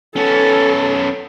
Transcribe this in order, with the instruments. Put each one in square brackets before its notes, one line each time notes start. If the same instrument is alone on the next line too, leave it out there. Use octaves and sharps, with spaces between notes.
[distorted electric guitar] B3 C#4 [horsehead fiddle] A4